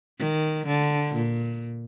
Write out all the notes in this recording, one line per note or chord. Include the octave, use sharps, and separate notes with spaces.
D#3
D3
A#2